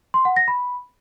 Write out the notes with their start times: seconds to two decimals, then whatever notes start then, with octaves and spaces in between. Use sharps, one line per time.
0.14 C6
0.25 F#5
0.36 A#6
0.48 B5